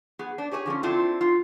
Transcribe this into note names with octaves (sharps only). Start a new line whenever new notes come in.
B3 G#4
D4
G4 G#4 C#5 D#5 G#5
D3 F3 A#3 C#4
C4 D4 E4 F4 A4
F4